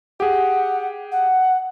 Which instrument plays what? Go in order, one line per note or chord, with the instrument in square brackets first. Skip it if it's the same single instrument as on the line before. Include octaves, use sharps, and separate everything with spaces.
[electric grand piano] G4 G#4 [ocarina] F#5
[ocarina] F#5